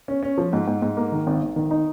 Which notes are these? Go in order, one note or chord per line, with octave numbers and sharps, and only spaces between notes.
C#4
C#4
F3
G#2
G#2
G#2
A#3
D#3
G#1
G#1
D#3
D#4